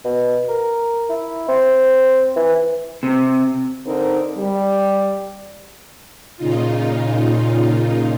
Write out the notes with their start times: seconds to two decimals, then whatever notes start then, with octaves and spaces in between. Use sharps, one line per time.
0.05 B2
0.49 A#4
1.10 E4
1.48 C4
2.36 E3
3.03 C3
3.86 D3 C4 D#4 A#4
4.37 G3
6.37 A#2 C#3 D#4 F4